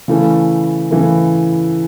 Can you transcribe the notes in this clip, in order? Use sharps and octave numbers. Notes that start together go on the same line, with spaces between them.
C#3 E3 A3 E4
C#3 E3 A3 E4